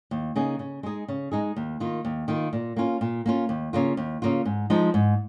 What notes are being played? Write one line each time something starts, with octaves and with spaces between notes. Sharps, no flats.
D#2
C#3 A#3 D#4 G#4
C#3
G#3 D#4 G#4
C#3
G#3 D#4 G#4
D#2
D#3 A#3 F4
D#2
D#3 A#3 F4
A#2
A#3 C#4 F4
A#2
A#3 C#4 F4
D#2
C#3 A#3 F4
D#2
C#3 A#3 F4
G#2
F3 G#3 D#4
G#2